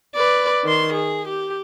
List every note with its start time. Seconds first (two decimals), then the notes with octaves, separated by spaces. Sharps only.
0.15 B4 D5
0.64 D#3 C6
0.94 G#4
1.28 G4